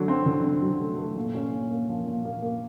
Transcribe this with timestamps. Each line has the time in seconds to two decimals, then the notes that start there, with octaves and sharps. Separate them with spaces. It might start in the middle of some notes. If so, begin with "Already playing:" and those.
Already playing: D3 F#3 A3
0.08 C4
0.26 D3
0.44 C4
0.62 F#3
0.80 A3
0.98 A3
1.16 A#2
1.35 C#4
1.52 A#2
1.71 A#3
1.89 F3
2.07 A#2
2.25 A#3
2.42 A#3